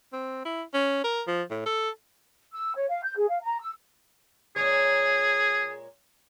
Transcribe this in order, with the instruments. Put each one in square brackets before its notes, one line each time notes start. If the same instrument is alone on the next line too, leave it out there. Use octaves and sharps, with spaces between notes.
[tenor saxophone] C4
E4
C#4
A#4
F3
A2
A4
[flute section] E6
C#5
F5
G6
G#4
F5
A#5
E6
[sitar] A#2 G#3 C#5 [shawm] G#4